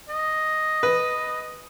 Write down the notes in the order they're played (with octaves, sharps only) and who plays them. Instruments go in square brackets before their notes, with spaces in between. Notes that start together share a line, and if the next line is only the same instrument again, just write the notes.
[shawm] D#5
[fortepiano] B4